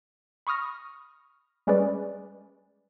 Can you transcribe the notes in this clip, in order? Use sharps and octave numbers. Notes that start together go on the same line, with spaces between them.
B5 C#6 D#6 F6 A#6
G3 G#3 C#4 G#4 B4 D5